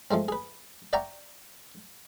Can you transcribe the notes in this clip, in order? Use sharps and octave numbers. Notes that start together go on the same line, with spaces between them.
F3 G#3 A3 C4
G#4 B4
D5 E5 F#5 G5 A#5 C#6